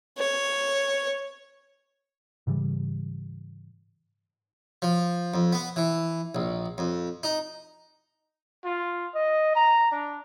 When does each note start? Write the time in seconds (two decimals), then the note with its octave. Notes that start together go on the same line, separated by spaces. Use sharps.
0.18 C#5
2.47 G#2 C#3 E3 G3
4.82 F3
5.34 F2
5.53 B3
5.76 E3
6.35 A#1
6.78 F2
7.23 D#4
8.65 F4
9.15 D#5
9.55 A#5
9.91 D4